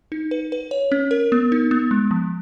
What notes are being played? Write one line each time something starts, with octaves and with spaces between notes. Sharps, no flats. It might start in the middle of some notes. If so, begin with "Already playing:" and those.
D#4
B4
B4
C#5
C#4
A#4
B3
D#4
B3
G#3
F3